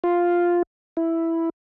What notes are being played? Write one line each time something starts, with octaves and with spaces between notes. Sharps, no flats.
F4
E4